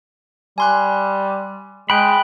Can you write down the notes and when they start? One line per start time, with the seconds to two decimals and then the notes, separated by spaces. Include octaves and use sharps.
0.58 G3 G#5 C6 F#6
1.90 G#3 G5 B5 F#6